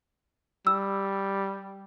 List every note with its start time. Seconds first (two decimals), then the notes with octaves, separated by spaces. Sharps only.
0.67 G3 E6